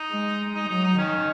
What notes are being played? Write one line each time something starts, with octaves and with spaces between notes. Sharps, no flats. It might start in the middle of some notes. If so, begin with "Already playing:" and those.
Already playing: D#4
G#3
D#4
F#3 D#4
D#4
D#3 C#4